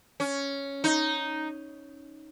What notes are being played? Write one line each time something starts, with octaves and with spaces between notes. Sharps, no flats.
C#4
D#4